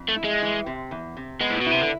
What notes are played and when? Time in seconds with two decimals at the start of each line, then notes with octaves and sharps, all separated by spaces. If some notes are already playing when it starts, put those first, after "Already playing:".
Already playing: F2
0.09 A3
0.16 E4
0.24 G#3
0.42 E3
0.66 C3
0.91 E2
1.17 C3
1.40 G#3 B3
1.50 A2
1.61 B2
1.66 C3 E4
1.81 D3